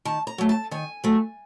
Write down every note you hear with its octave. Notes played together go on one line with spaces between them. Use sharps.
D#3 A5
A#5
F#3 A3
A5
D#3 G#5
F#3 A3